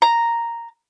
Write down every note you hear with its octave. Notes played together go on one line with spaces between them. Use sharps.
A#5